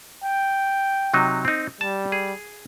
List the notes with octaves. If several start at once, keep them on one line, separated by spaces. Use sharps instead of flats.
G5
C3 F#3 D#4
C4 D#4
G3 A5
G#4